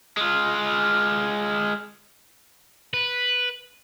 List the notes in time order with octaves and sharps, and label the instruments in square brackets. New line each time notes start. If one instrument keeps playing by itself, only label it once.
[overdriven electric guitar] G#3 F4
[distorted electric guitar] B4